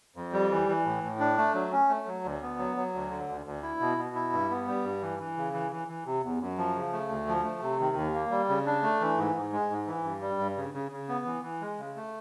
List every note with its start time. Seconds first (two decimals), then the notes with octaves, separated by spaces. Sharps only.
0.16 F2
0.33 G3
0.51 E3
0.68 E3
0.85 A2
1.03 A2
1.20 D4
1.38 A3
1.54 F#3
1.72 C#4
1.89 A3
2.06 F#3
2.24 D2
2.42 B3
2.59 F#3
2.77 F#3
2.94 D2
3.11 D3
3.29 D2
3.46 D2
3.63 E4
3.81 B2
3.98 B2
4.15 E4
4.33 G2
4.50 B3
4.68 G3
4.84 G2
5.01 E3
5.19 E3
5.37 C#3
5.53 E3
5.72 E3
5.88 E3
6.06 C3
6.23 E2
6.41 F#2
6.58 F3
6.75 C#3
6.93 A3
7.09 D2
7.28 F3
7.44 A3
7.62 C3
7.80 D#3
7.96 D#2
8.14 A#3
8.31 G3
8.49 C#3
8.66 D4
8.83 A3
9.01 E3
9.18 G#2
9.36 G#2
9.53 G#3
9.70 G#2
9.87 E3
10.04 G2
10.21 G3
10.39 G2
10.57 C#3
10.74 C#3
10.92 C#3
11.09 B3
11.25 E3
11.43 E3
11.61 G#3
11.79 C#3
11.96 A3